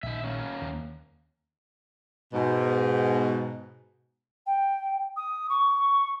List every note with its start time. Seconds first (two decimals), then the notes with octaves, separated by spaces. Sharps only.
0.03 A#1 D#3 D#4 E5
0.24 A#3 C#4
0.61 D#2
2.33 G#2 B2
4.46 G5
5.16 D#6
5.49 C#6